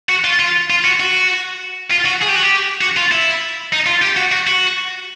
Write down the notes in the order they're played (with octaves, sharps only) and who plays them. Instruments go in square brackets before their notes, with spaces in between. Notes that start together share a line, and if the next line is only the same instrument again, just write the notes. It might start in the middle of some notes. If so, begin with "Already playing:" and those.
[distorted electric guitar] F#4
F4
F4
F4
F#4
F#4
F4
F#4
G#4
G4
F#4
G4
F#4
F4
E4
D#4
F4
G4
F#4
F#4
F#4